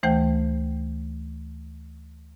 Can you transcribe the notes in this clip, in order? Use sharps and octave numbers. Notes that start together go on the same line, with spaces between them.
D2 E3 A3 C5 G5 G6